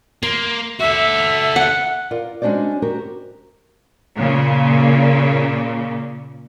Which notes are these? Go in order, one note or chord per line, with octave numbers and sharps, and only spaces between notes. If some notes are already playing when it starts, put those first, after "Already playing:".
A#3 C6
F#4 A4 E5
F#5
F4 A#4 D5
G#3 C#4 D4 F#4 C5 D5
F#4 G4 A#4 C5
A#2 C#3